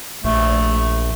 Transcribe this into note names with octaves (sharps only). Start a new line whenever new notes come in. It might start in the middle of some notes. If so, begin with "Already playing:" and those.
A#1 A3